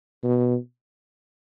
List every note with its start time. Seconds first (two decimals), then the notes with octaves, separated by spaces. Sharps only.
0.24 B2